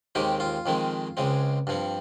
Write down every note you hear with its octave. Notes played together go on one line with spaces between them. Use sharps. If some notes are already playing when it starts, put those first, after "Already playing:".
D#2 D#3 G#3 C4 G4
F4
F2 D#3 G#3 C4
C#2 C#3 G#3 C4
G2 F3 C4